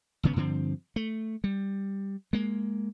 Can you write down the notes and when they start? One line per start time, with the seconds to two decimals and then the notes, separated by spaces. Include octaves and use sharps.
0.23 G#1 C#3 B3
0.36 G2 D3 F3 C4
0.96 A3
1.44 G3
2.33 G#3 A#3